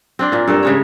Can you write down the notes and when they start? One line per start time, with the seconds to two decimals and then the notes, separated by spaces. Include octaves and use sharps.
0.19 C4 D4 D5
0.32 A#2 A#3
0.48 G2 A4 A#4
0.63 C#3 G#3 C#5